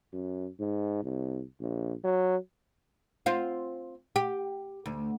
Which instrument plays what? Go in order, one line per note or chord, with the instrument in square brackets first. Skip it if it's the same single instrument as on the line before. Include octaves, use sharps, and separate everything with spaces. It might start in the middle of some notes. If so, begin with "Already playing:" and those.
[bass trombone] F#2
G#2
C2
A#1
F#3
[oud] C4 F4
G4
D2